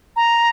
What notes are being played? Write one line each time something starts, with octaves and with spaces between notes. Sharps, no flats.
A#5